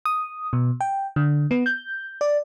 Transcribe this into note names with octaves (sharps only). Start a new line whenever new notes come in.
D#6
B2
G5
D3
B3
G6
D5